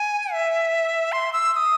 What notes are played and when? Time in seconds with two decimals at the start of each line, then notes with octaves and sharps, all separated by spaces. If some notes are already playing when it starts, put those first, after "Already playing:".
Already playing: G#5
0.33 E5
1.12 C6
1.33 E6
1.53 E6
1.56 D#6